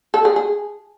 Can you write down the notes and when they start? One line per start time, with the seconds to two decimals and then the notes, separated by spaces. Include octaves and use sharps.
0.14 A4
0.25 G#4
0.36 G#4